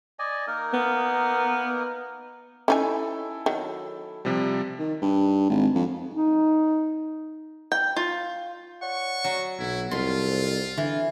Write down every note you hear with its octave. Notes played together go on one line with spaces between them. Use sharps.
D5 D#5 G#5
A#3 D#4 A#4
B3
C#4 D#4 E4 A4 G#5
D#3 F#3
C3 F3 G3
D#3
G2
G#1
F2
D#4
G5
F4
C#5 D5 F#5 C#6
F#3
B1 E4
C2 F2 F4 C6
D3 E3